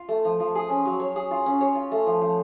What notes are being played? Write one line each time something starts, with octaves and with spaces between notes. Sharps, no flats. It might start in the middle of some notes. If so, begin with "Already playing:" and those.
Already playing: F4
A3
F3
F3
G#4
C#4
F#3
C#5
G#4
F4
C#4
C#5
F4
A3
F3
F3